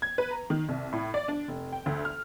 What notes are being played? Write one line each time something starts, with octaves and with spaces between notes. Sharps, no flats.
G#6
B4
A#5
D#3
C2
A2
D5
D4
F1
G5
D2
F6